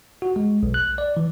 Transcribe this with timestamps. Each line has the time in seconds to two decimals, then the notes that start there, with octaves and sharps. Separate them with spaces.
0.22 F#4
0.36 G#3
0.63 B1
0.74 F#6
0.98 D5
1.17 E3